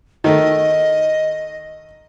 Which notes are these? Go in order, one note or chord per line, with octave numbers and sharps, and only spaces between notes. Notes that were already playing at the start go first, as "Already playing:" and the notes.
D#3 A3 D#5